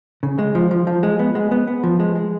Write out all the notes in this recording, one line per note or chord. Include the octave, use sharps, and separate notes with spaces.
C#3
G#3
F3
F3
F3
G#3
B3
G#3
B3
B3
F3
G#3
G#3